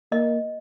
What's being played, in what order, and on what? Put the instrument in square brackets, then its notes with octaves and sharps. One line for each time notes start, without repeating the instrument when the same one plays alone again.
[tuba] A#3 [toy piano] D#5